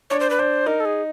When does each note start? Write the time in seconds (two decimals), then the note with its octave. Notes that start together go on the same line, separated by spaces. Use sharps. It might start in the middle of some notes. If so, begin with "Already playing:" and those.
0.10 D4 C#5
0.20 C5
0.30 B4
0.39 D4 C5
0.66 D#4 A#4
0.80 A4
0.85 G#4